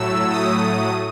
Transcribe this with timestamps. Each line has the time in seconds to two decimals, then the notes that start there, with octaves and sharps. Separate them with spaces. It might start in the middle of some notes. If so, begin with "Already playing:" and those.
Already playing: A2 F#3 A3 E6
0.31 D#6